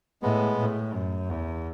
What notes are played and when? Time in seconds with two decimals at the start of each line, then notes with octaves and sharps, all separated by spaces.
0.22 A2 G#3 B3
0.59 A2
0.94 F#2
1.30 E2